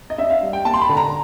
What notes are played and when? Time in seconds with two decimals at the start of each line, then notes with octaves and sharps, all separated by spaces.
0.10 D#5
0.18 D4 E5
0.30 F5
0.42 G3
0.53 G5
0.65 A#3 A5
0.74 C6
0.81 B5
0.89 D3
0.97 A#5